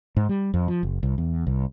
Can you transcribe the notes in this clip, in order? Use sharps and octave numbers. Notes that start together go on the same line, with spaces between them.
G#2
G3
F2
F3
F#1
C2
E2
C2